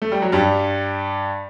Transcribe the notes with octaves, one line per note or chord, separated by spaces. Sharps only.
A3
G3
F#3
G2 G3